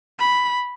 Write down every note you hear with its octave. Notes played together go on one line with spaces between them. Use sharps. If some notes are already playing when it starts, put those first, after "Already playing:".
B5